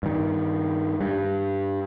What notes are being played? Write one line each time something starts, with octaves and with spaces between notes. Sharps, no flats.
G2 D#3
G2